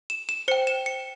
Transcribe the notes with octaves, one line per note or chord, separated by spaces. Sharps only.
E7
E7
C5 G5 C#7
E7
C#7